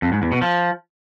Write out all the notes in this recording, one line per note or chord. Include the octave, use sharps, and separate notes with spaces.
F2
G#2
E2
B2
F3